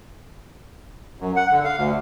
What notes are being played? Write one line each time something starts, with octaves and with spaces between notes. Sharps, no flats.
F#2
F#5
D3
F5
D2